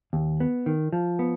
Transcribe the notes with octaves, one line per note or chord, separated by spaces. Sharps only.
D#2
B3
D#3
F3
B3